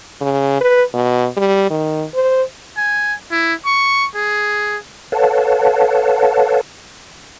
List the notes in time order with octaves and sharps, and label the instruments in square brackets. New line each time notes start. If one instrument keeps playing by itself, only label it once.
[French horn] C#3
B4
B2
G3
D#3
C5
[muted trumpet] G#5
E4
C#6
G#4
[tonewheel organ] A4 B4 C#5 F5 F#5 A5